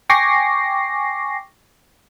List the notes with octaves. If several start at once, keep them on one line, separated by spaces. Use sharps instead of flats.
G5 G#5 C#6 D6 A#6 C7